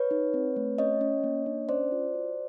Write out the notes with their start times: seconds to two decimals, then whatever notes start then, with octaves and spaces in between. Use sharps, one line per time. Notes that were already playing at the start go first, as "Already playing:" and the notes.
Already playing: B4 C#5
0.11 D#4
0.34 C4
0.56 A3
0.78 C#4 C#5 D#5
1.01 C#4
1.24 A#3
1.46 D4
1.69 C#4 C5 D5
1.92 F4
2.15 F#4